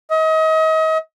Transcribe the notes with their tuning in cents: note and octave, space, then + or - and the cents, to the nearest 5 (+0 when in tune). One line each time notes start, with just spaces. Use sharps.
D#5 +35